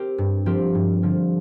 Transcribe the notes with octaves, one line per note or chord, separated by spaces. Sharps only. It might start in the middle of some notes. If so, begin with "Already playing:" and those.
Already playing: C4 G4 A#4
G2
F3 C4 G4 A#4
G2
D3 F3 C4